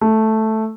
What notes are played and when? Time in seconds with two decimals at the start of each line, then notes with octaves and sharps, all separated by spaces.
0.01 A3